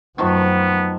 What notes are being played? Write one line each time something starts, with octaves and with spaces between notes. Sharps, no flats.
F#2 D#3 F3 F#3 A3 B3